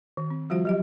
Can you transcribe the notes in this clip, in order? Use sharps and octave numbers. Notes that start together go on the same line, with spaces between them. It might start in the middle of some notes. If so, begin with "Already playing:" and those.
D#3
C4
F3 G3 F4 F#4 C5 E5
F#3 G4 D#5